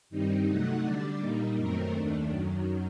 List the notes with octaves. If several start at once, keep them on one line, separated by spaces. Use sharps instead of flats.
G2 D#3 G3 C4 D#4
C3 F#3 A3 D#4 F#5
D3 G3 D4 D5
A#2 G3 A#3 D#4
F#2 D#3 F#3 A3 C4 A#4
D#2 D#3 A3 D4
F#2 D#3 F#3